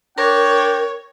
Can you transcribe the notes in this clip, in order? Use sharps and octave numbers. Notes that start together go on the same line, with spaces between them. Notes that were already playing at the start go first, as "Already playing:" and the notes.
D4 A#4 C#5 G5